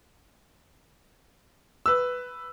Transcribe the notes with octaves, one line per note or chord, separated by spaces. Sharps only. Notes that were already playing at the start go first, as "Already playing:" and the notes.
B4 E6